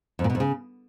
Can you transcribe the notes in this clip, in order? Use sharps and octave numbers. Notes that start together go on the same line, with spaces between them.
F2
A#2
B2
F2
C#3